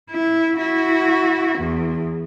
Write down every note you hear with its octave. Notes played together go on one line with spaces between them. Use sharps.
E4
E4 F#4
E2